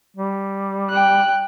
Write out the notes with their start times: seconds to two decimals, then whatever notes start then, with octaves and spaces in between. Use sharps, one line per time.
0.17 G3
0.90 G5 F#6